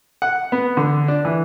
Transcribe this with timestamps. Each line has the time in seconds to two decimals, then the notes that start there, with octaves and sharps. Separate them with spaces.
0.22 F#5
0.52 B3
0.77 D3
1.08 D4
1.25 E3